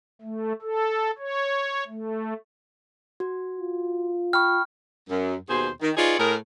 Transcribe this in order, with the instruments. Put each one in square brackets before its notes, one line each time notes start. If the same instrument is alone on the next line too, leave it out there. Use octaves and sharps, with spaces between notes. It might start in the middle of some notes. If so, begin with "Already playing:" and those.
[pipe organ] A3
A4
C#5
A3
[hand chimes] F#4
[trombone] F4
[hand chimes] G5 B5 C#6 [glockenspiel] F6
[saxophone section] F#2
D#2 B2 G#4 C5
D#3
D#4 F4 G#4 B4 C#5 D5
A2 G#4 A#4